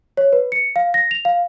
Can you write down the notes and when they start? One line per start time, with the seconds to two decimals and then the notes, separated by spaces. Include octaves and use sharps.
0.17 C#5
0.33 B4
0.52 C#7
0.76 F5
0.94 A#6
1.11 F7
1.25 F5